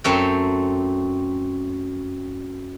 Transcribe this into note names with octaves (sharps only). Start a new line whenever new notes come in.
F#2 A3 C4 C#5 E5 G5